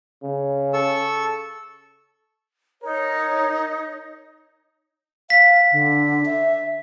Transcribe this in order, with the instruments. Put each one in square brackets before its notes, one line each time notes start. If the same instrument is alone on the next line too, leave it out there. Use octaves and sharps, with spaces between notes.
[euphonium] C#3
[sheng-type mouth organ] A4 C#6 E6
[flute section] D#4 C#5 [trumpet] A#4
[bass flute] F5 [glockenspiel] B6
[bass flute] D3
E5